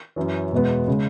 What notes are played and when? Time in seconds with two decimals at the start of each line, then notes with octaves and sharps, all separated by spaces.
0.16 F#2 E3 C#4
0.52 E1 E2 B2 G#3 B3
0.88 C#3 G#3